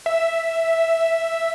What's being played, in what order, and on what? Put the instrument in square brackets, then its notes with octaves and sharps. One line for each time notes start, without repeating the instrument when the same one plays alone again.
[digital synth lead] E5